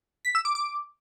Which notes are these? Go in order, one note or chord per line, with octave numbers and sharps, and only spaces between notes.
B6
E6
D6
D6